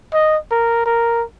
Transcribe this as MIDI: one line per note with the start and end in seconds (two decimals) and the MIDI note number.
0.13 0.37 75
0.51 0.82 70
0.86 1.24 70